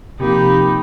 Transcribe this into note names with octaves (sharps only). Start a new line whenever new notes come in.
C3 F3 A#3 D#4 G4 B5